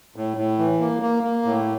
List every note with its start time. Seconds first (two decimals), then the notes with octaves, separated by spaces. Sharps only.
0.16 A2
0.37 A2
0.58 E3
0.80 A#3
1.02 A#3
1.23 A#3
1.44 A2